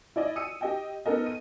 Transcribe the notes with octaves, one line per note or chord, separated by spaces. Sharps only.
E4 D5 D#5
D#6 E6 C#7 D#7
G4 D#5 G5
B3 D#4 A4 A#4 D#5
D#7